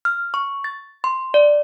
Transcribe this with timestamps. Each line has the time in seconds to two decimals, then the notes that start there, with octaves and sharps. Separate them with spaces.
0.05 F6
0.34 C#6
0.64 A6
1.04 C6
1.34 D5